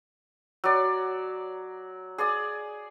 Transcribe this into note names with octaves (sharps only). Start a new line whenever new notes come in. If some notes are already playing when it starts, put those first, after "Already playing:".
F#3 D5
G#4 D5 D#6